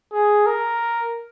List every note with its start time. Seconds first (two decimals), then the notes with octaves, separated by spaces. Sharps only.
0.13 G#4
0.46 A#4